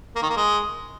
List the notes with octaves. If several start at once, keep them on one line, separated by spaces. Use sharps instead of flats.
A#3
D#3
A#3
G#3